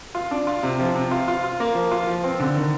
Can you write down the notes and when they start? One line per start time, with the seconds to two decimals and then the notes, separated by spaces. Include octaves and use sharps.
0.15 F4
0.31 D4
0.47 F4
0.63 C3
0.79 F3
0.95 C3
1.11 F4
1.28 F4
1.43 F4
1.60 A#3
1.75 F3
1.91 F4
2.07 F3
2.24 C4
2.40 D3
2.56 D#3